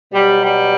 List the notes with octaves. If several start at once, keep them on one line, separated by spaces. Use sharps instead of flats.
B2 F#3 G3
G3